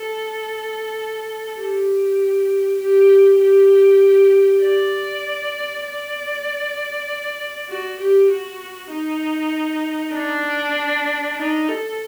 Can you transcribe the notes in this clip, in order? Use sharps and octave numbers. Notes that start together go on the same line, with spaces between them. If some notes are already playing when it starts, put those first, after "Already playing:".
Already playing: A4
G4
G4
G4
D5
D5
F#4
G4
F#4
D#4
D4
D#4
A4